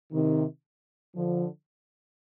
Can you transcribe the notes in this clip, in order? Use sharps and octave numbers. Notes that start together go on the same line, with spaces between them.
C3 D#3
D3 F3